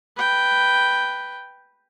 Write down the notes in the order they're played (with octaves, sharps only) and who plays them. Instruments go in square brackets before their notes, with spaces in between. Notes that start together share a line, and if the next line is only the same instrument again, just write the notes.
[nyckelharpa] B4 G5